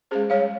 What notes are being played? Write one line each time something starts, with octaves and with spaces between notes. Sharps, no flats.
G#3 C#4 G#4 C5
G3 C#5 F5